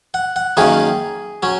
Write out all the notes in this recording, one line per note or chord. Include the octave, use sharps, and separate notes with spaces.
F#5
F#5
F#2 D#3 A#3 C#4 G#4
F#3 C#4